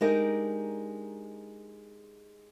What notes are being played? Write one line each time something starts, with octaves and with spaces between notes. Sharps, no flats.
G#3 D4 D#4 G4 A#4